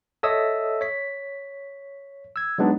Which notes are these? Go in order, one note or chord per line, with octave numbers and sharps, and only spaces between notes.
A4 C#5 D#5 E5 D#6 E6
C#5 B6
E6 G#6
F#3 G#3 B3 D4 D#4